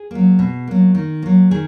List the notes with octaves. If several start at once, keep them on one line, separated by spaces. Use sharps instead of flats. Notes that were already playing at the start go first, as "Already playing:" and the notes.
Already playing: G#4
F#3 A#3
B2
F#3 A#3
D#3
F#3 A#3
D#3 G#4